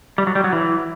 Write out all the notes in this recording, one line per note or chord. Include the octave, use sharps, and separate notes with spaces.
G3
F#3
G3
F#3
E3